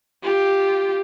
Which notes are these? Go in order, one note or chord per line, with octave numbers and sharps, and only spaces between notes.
F4 G4